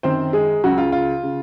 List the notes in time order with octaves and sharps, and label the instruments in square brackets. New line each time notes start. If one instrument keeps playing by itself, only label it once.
[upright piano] F#2 D#3 C4 C5
G#3 G#4
C#2 C#3 F#3 F#4
F4
F4
C#3